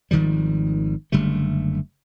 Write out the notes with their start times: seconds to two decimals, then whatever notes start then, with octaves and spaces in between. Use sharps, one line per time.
0.11 G#1 D#3 F3 G3
1.12 F#1 D3 G3 A3